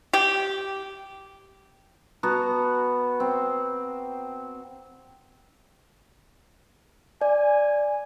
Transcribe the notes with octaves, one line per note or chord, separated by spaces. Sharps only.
G4
B3 F#4 A5 A#5
C4
D5 G#5